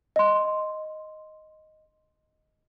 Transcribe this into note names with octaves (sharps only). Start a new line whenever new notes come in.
D#5 C6